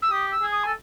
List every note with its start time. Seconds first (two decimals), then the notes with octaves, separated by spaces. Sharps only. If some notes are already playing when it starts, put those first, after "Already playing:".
0.02 E6
0.11 G4 D#6
0.31 E6
0.42 G#4
0.52 D#6
0.63 A4 G#5